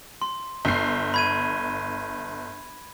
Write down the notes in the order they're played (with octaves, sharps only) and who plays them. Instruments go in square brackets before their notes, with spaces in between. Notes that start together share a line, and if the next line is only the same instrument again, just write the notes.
[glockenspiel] C6
[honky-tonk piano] G1 C7
[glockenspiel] B5 G#6 D#7